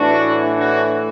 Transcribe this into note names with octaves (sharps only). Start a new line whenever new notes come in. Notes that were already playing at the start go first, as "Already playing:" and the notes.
Already playing: A2 E3 D4 F#4
D4 F#4